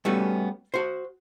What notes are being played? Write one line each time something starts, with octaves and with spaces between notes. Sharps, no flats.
G3 A3 B3 C#4 F#4 A4
F#4 C5